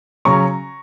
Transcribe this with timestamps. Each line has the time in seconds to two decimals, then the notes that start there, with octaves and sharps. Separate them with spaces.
0.25 C#3 F#3 C#4 A#5 C#6